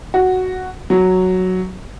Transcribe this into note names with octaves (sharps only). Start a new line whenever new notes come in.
F#4
F#3